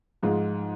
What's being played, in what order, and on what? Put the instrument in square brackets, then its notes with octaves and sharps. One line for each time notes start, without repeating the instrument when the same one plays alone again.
[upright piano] G#2 F3 G#3 F4